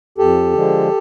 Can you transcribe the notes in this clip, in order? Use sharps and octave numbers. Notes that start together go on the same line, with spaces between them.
F2 G4 A4
D3 F3 G#3